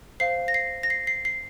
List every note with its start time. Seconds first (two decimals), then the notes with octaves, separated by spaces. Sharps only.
0.20 C5 F5 C7
0.48 A#6
0.54 C7
0.83 A#6
0.90 C7
1.07 C7
1.25 C7